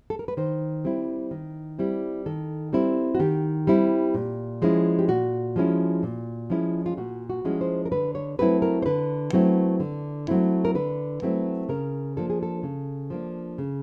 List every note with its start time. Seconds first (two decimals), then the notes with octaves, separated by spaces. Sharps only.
0.10 A4
0.19 A#4
0.28 B4
0.37 D#3 C5
0.84 G3 C4 E4
1.31 D#3
1.79 G3 C4 E4
2.26 D#3 A4
2.73 G3 C4 E4
3.15 F#4
3.19 D#3 G4
3.67 G3 C4 E4
4.14 A#2
4.62 F3 G#3 C#4 E4
4.99 G4
5.08 A#2 F#4
5.56 F3 G#3 C#4 E4
6.03 A#2
6.50 F3 G#3 C#4 E4
6.86 F4
6.97 A#2 F#4
7.30 F#4
7.45 F3 G#3 C#4 E4
7.61 C5
7.85 A#4
7.92 D3 B4
8.15 C#5
8.39 F#3 A3 C4 E4 B4
8.62 A#4
8.82 C5
8.86 D3 B4
9.33 F#3 A3 C4 E4
9.80 D3
10.28 F#3 A3 C4 E4
10.65 A#4
10.75 D3 B4
11.22 F#3 A3 C4 E4
11.69 C#3 A#4
12.17 F3 A#3 D4 A4
12.30 G#4
12.43 A4
12.63 C#3
13.10 F3 A#3 D4
13.58 C#3